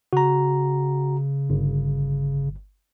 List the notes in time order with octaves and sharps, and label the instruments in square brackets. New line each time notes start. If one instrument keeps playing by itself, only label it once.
[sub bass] C#3 [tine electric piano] F#4 A#5
[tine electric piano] G1